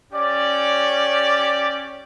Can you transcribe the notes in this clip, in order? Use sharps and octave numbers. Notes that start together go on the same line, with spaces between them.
C#4 G4 D5